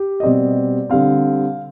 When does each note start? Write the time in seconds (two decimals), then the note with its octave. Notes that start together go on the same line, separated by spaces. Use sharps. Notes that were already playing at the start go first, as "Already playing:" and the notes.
Already playing: G4
0.20 D#5
0.23 B2 G3 C4 D5
0.89 D3 G3 C4 F5